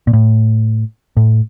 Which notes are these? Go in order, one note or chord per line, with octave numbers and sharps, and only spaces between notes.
A#2
A2
A2